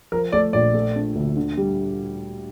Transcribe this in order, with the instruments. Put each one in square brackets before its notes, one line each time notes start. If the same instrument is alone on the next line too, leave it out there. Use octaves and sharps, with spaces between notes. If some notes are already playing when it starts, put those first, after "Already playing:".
[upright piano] F3 [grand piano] A#4
[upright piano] A3 [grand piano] D5
[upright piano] A#1 [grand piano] D5
[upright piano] A3
D4
D2
D3
G3